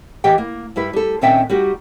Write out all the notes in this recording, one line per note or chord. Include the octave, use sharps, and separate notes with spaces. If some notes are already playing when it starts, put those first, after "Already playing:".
E3 G4 D#5 G5
A#3
G2 G3 E4 B4
G3 A4
A#2 D#3 C4 C#4 E5 G5
G3 D#4 F#4 G4